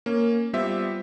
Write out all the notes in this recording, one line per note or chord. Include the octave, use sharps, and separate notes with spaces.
A#3 C#4
G3 B3 F4 G4 C5 E5